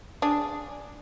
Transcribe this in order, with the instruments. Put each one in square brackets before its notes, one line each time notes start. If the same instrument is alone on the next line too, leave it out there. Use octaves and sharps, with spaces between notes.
[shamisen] D4 G#4